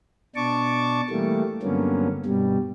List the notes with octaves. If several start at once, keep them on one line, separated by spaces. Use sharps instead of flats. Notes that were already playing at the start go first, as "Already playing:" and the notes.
B2 D4 A5 C#6 D6
E3 G3 A3 A#3
G2 D3 F#3 A#3 B3 C#4
G2 B2 G3